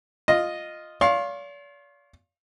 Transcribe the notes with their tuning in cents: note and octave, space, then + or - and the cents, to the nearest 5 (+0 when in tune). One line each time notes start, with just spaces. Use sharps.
F4 +0 D#5 -5
D5 -45 F5 +0 C6 +45